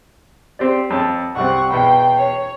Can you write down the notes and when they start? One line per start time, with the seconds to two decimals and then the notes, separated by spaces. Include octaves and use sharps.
0.59 C4 G4 D5
0.90 F2 C#5 A5
1.36 C2 G3 C4 F#5 C#6
1.71 E2 B2 G5 B5
2.17 C#5